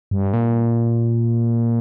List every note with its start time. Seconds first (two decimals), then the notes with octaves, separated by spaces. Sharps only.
0.11 G2
0.33 A#2